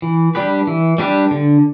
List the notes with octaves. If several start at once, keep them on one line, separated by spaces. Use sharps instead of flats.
E3
G3 D4 G4 B4
E3
G3 D4 G4 B4
D3